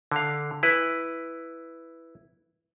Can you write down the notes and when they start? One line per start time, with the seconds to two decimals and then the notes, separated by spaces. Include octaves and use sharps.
0.11 D3 F5
0.63 E4 B4